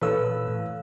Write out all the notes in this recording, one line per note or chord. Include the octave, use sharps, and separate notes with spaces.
A#2 E3 A4 B4 C#5 F5 E6
A2